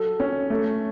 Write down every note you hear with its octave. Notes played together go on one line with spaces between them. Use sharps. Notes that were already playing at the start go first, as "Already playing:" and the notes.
Already playing: F#3 A4
C#4
A3